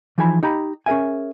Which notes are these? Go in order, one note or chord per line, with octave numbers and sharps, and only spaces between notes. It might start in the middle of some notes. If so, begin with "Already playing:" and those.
E3 F3 D#4 G#4 G#5 B5
D#4 G4 A#5 B5
C#4 G#4 A#4 E5 G#5